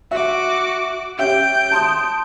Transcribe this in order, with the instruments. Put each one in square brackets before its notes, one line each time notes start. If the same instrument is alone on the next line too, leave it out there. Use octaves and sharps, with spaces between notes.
[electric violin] F#4 D6 [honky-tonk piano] E5
[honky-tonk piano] C#4 G4 E5 [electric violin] G6 D7
[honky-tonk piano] A5 C6 D#6